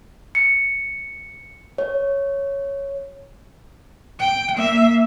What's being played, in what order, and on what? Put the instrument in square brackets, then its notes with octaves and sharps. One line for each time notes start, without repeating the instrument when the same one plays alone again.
[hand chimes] C#7
C#5
[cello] G5
A#3 E5